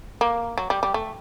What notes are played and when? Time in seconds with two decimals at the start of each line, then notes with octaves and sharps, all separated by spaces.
0.21 A#3
0.58 F#3
0.70 G3
0.83 G3
0.94 A3